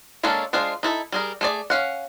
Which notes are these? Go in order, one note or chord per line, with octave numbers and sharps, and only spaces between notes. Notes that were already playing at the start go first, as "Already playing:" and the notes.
G#3 A#3 C#4 D4 A4
G#3 D4 F4 G#4 C5
D#4 E4 A4
G3 G#4 A#4
A3 G#4 D5
C#4 F5 F#5